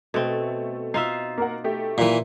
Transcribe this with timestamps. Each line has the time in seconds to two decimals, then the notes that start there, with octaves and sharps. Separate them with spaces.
0.14 B2 A3 C4
0.94 D#4 F4 E5 C7
1.38 A#3 A#4 F#5
1.64 A3 G4
1.98 A#2 E3